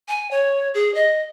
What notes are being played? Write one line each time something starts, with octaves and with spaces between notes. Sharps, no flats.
G#5
C#5
G#4
D#5